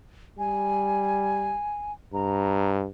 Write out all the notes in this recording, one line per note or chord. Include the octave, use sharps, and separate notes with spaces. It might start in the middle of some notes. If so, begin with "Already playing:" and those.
G3 G#5
G2 A#5